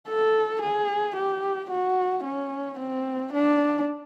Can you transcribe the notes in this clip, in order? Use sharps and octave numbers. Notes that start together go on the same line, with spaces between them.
A4
G#4
G4
F#4
C#4
C4
D4